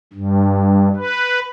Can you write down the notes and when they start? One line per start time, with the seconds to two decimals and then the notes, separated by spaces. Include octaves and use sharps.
0.13 G2
0.96 B4